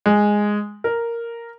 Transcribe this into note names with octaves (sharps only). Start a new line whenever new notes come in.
G#3
A#4